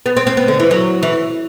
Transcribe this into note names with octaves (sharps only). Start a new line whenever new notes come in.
B3
C4
C4
B3
D3
E3
F#3
E3